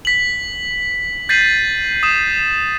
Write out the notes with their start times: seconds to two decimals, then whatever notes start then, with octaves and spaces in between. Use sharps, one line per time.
0.05 B6 F#7
1.29 G6 A6 B6 C7 D#7 F#7
2.03 D#6 E7